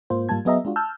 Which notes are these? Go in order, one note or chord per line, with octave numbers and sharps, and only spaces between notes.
G#2 A#3 F4 C5
G#2 G3 A#3 F4 A5 G#6
F#3 B3 G#4 D#5 E5 A#5
G#3 D4 F4 F#4
A5 E6 F6 G6